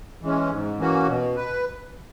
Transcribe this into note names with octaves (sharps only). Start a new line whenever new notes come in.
E3 G#3 C#4
G#2
E3 A#3 C#4 F#4
B2
B4